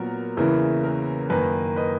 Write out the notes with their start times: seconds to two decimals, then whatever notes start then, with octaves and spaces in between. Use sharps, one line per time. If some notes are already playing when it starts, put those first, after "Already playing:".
Already playing: A#2 F#3 B3 A#4
0.37 E2 C#3 E3 A#3 E4
0.84 A#4
1.30 F#2 D#3 A#3 B4
1.76 B4 D#5